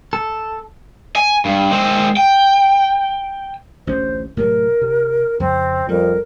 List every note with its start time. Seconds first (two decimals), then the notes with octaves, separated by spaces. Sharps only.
0.13 A4
1.16 G#5
1.45 G2
1.71 G#3 C4
2.17 G5
3.87 A1 D2 C#4 C5
4.37 A2 C3 F#3 A#4
4.82 C3
5.40 F2 C#3 C4
5.89 F2 G3 A#4